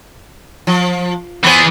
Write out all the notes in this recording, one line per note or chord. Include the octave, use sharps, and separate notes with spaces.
F3
E3 B3 G#4 C5